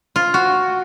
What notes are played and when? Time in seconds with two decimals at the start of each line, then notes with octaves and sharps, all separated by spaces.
0.16 F4
0.34 F#4